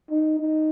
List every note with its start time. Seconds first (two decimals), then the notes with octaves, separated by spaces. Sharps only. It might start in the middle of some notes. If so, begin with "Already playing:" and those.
0.10 D#4
0.39 D#4